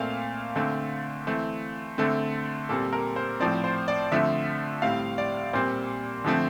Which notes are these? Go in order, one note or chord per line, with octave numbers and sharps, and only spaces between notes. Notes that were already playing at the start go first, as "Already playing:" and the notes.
Already playing: A#2 A3 C4 F5
D3 A3 C4
E3 A3 C4
D3 A3 C4 A4
A#2 G3 C4 A4
A#4
C5
A2 F3 C4 D5
C5
D5
D3 F3 A3 C4 E5
A2 G3 C4 F5
D5
A#2 G3 C4 C5
D3 F3 A3 C4